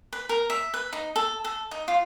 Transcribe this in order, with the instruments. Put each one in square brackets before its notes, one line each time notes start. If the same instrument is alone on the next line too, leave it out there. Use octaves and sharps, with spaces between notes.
[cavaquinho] B4
A#4
E5
B4
D#4
A4
A4
D#4
F4